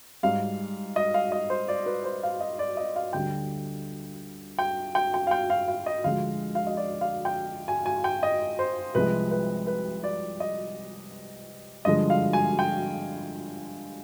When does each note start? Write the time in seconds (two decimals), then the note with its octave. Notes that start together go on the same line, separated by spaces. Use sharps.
0.23 G#2 G3 F5
0.96 D#5
1.14 F5
1.32 D#5
1.50 C5
1.68 D5
1.86 B4
2.04 C5
2.23 F5
2.41 D#5
2.59 D5
2.77 D#5
2.96 F5
3.13 D2 D3 G3 G5
4.59 G5
4.95 G5
5.14 G5
5.27 F5
5.31 G5
5.50 F5
5.68 F5
5.86 D#5
6.04 D2 D3 F3 G#3 F5
6.55 F5
6.67 D#5
6.77 D5
7.01 F5
7.25 G5
7.68 G#5
7.86 G#5
8.04 G5
8.23 D#5
8.59 C5
8.95 C2 C3 F3 G#3 B4
9.31 B4
9.67 B4
10.04 D5
10.40 D#5
11.85 G2 D3 F3 G#3 D#5
12.10 F5
12.33 G#5
12.59 G5